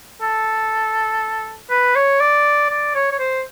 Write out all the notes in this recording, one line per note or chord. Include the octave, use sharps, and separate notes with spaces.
A4
B4
C#5
D5
D5
C#5
C#5
C5